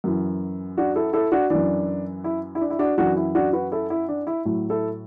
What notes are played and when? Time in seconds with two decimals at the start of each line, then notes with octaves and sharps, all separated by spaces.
0.04 F#2 E3
0.77 D4 F#4
0.95 E4 A4
1.13 E4 A4
1.32 D4 F#4
1.50 F#2 E3 D4
2.24 E4
2.55 E4
2.61 D4
2.70 E4
2.79 D4 F#4
2.98 F#2 E3 D4 F#4
3.16 E4
3.35 D4 F#4
3.53 F#4 B4
3.72 E4 A4
3.90 E4
4.09 D4
4.27 E4
4.45 A2 F#3 E4
4.70 E4 A4